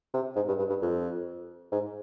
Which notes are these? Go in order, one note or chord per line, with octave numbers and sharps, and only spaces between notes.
C3
G#2
G2
G2
G2
F2
G#2